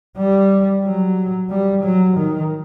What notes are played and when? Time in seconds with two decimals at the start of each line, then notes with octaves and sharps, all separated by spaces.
0.18 G3
0.83 F#3
1.50 G3
1.83 F#3
2.16 D#3